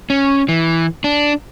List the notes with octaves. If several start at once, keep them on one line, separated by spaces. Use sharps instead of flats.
C#4
E3
D4